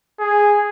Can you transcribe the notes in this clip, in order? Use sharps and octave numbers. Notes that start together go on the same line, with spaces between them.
G#4